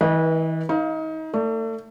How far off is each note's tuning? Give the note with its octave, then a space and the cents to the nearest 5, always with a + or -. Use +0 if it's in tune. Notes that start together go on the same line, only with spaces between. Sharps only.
E3 -35 B4 -25 D#5 +0
D#4 +30 F5 +0
A3 +35 D5 +0